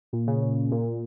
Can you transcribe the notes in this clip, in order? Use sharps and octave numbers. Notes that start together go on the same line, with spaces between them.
A#2
C#3
C#3
A#2